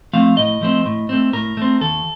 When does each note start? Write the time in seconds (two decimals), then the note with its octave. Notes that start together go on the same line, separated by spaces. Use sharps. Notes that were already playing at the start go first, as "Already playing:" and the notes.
0.13 F3 A3 C4 F5
0.37 A2 D#5
0.62 F3 A3 C4
0.85 A2
1.09 A3 C4
1.33 A2 A#4
1.57 A3 C4
1.81 D#2 A4